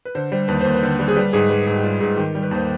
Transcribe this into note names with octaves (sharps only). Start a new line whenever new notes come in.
B4
D3 C5
G3 C5
D#2 B4
D#2 C5
B4
D3
G3
G#4
G3 B4
G#2 G#4
G3 B4
G#2 G#4
G4
G3 F4
G#2 G#4
D#3 G4
G3
B4
D#2 C5